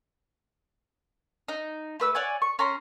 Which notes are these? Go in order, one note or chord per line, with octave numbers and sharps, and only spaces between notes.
D#4
A3 B4 E6
C#5 D5 F#5 G#5
C#6
C#4 A#5 C6